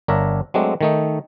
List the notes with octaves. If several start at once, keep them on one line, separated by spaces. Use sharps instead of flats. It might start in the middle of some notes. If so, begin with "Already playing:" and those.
G1 D4 A#4 C#5 E5 A#5
F#3 G#3 A3 C4 D4
D#3 A3 D#4